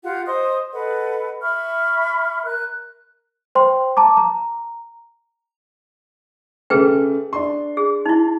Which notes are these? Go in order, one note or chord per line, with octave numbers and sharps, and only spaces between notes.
F4 G4 F#5
C5 D#5 C6 D#6
A4 B4 D#5 F#5
E5 B5 C#6 F6
A#4 F#6
C5 G5 C6
A5 A#5 D6
A#5
C#3 A3 G#4 B4 G5
D4 C6
G#4
D#4 E4